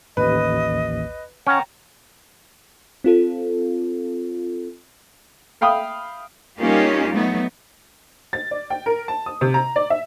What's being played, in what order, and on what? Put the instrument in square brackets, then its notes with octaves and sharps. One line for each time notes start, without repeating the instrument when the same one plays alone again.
[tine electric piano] A1 D#2 [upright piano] B4 [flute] D#5
[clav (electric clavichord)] C#4 [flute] F#5 [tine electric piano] G5 A#5
[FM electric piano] C4 F4 A4
[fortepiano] E5 F5 G5 B5 D#6
[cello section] G3 A#3 C#4 D#4 F4 G4
F#3 A3 B3 D#4
[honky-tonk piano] A6
D5
G5
A#4
A5
D#6
C3
A#5
D5
E5